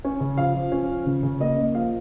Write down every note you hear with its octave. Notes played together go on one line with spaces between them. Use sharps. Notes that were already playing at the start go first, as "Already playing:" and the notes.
C#4
C#3
F3 F5
F3
C#4
F3
C#3
C#3
A#3 D#5
A#3
F3 F5